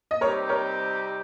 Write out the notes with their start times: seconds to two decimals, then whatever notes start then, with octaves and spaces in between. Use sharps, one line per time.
0.11 D#5
0.21 C3 G3 C4 D#4 G4 A#4 C#5
0.49 A#4 C#5